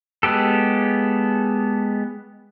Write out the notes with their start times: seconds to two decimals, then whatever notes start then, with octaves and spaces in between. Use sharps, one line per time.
0.23 G#3 B3 G4 A4